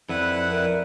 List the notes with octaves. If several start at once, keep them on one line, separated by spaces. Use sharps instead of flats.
F2 E4 B4 D5 F#5
A#4 D5 E5